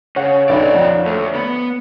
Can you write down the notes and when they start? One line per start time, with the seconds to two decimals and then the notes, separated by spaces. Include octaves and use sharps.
0.16 C#3 C#5 F#5
0.49 B1 D3 D#4 D5
0.75 F2
1.05 D2 A4
1.35 B3 B5